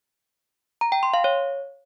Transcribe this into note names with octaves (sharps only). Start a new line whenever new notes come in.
A#5
G5
C6
F5
C#5